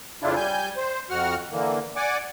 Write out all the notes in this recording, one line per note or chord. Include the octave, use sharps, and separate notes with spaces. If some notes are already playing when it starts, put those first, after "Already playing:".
F2 C#3 D4 E4 F4
G3 G#5 G6
C5
F2 F#4 F#5 F6
D3 E3 A#3
D5 F#5 G#5 D6